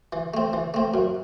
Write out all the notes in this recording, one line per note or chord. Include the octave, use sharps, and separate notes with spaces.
E3
A3 C4
E3
A3 C4
F#2